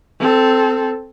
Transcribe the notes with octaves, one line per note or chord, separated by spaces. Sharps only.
C4 A4